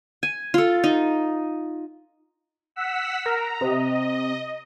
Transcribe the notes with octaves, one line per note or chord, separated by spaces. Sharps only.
G#5
F4 A4
D#4
F#5 E6 B6
A#4 A#5
C3 D#5